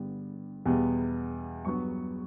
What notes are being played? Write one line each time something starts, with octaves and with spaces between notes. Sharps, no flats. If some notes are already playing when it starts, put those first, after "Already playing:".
Already playing: G2 D3 G3 B3
E2 B2 G3 B3
G2 F#3 B3 C#6